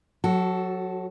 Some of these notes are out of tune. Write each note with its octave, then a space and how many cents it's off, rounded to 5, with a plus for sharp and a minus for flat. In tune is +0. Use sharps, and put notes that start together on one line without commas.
F#3 -20 F#4 +20 A4 +0